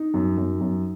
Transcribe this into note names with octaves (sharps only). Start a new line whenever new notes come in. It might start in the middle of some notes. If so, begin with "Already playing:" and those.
Already playing: D#4
F#2
F#2
F#2